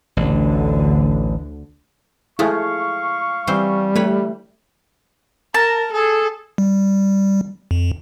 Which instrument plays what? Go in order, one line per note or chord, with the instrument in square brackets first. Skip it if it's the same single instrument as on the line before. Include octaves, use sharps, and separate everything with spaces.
[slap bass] A1 [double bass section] D2 D3
[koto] F3 G#3 A3 [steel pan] E4 G#5 [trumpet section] F5 C#6
[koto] E3 C4 C5 [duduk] G3
[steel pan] A3 G4 [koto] B4 C#5
[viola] A#4 [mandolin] A5 [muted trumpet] A#5
[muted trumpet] G#4 [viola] A4
[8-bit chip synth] G3
F2